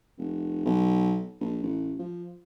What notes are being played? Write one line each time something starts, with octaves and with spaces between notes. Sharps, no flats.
F1
B1
A#1
A1
F3